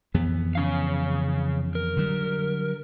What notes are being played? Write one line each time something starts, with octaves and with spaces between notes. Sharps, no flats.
F2 E3 B3
C#3 C#4 F5
A#4
D3 F#3 G3